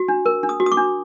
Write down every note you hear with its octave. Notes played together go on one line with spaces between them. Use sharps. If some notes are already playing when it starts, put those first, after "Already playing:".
Already playing: F#4
D4
A#4
D4
D#6
F#4
D#6
D6
D4